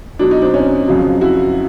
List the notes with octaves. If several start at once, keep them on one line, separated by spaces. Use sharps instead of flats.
B2 F#3 D4
D#4
C4 D4
C#4 D#4
F2 C#3 F#3
E4 F#4